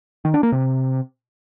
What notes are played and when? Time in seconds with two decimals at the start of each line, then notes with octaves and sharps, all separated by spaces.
0.25 D#3
0.34 D4
0.43 A#3
0.52 C3